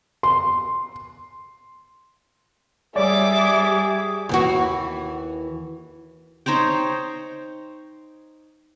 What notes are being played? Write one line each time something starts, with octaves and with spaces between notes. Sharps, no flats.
C6
G3 G#4 C#5 D5 E5 D6
D#2 E3 F#4
D#4 C5 C#5 G5